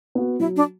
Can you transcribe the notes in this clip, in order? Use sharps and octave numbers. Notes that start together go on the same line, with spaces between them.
B3 F#4
F#3 E4
D4